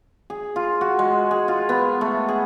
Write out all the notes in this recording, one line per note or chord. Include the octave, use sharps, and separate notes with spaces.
G#4
F4
F#4
G#3
G#4
F4
B3
A3
G#4